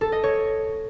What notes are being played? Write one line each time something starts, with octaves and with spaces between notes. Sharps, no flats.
A4
D#5
C#5